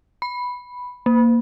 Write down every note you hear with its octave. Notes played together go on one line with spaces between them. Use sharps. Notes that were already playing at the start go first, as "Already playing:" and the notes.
B5
A#3